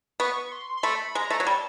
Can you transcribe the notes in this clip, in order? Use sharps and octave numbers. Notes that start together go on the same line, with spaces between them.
B3 C#6
C6
C6
A3 B5
G#3 A#5
A3
F#3
G3 A5